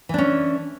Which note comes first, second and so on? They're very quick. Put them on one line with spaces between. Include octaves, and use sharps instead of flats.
E3 D4 C#4